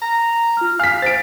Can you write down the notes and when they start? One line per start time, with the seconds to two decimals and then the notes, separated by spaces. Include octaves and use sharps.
0.02 A#5
0.57 F4 F6
0.80 F5 G#5 F6 B6
1.02 C5 A6 D7